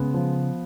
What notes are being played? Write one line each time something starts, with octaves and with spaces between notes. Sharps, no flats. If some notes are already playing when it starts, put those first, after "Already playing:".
Already playing: C#3 G#3 B3
F3